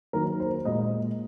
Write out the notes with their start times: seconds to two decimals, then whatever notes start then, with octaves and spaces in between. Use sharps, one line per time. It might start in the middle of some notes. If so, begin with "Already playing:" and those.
0.13 D#3 F#3 A#3 A#4
0.40 C5
0.65 A#2 G#3 D#5